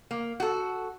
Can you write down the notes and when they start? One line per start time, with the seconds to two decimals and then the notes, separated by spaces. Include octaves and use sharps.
0.11 A#3
0.40 F#4 A4